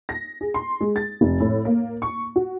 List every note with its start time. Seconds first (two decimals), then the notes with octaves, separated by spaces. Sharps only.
0.09 A#6
0.41 G#4
0.54 C6
0.81 G#3
0.96 A6
1.21 F1
1.40 A2
1.65 A#3
2.02 C#6
2.36 F#4